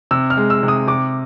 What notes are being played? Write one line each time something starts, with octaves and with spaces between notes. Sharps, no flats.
C3 E6
F6
G#3
E6
C3
D#6
C3 D6